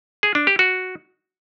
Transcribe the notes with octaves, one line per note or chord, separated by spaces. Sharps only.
G#4
D4
G4
F#4